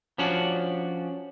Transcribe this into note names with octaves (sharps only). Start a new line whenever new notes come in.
F3 C#4 D4 F#4